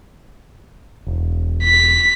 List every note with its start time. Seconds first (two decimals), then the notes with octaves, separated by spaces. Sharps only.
1.07 E1
1.63 B6